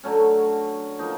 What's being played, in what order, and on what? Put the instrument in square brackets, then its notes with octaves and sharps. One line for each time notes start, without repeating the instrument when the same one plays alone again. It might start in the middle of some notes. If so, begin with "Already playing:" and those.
[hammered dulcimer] D3 F#3 A3 C#4
F3 A#3 D#4